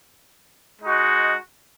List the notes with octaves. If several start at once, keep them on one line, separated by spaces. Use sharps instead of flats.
G#3 D#4 F#4